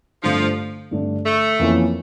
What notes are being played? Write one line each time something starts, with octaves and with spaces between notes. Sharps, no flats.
G2 D3 F3 A3
G2 D3 A3 D4
A3
F2 E3 A#3 C#4 E4